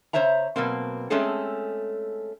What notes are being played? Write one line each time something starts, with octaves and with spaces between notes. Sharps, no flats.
C#3 A#3 C5 C#5 E5 A#5
B2 F#3 A#3 C4
G#3 A3 C4 C#4 G#4 A4